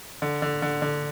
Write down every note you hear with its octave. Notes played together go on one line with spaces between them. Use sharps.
D3
D3
D3
D3